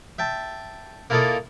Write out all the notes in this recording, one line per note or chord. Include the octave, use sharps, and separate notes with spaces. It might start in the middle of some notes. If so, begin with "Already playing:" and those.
E5 G5 A5
A#3 E4 F4 A4 D5 D#5